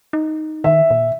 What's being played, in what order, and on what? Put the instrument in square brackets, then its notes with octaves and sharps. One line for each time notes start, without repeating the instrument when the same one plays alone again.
[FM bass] D#4
[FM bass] D#3 [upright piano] E5
[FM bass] A#2